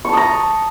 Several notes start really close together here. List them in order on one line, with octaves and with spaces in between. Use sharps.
C#6 A5 D#6 A#5